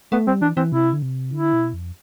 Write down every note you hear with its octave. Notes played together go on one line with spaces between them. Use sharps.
A3 B3
G3 C4
E3 D4
E3 C4
C3 E4
D3
C3
D3 E4
B2
F2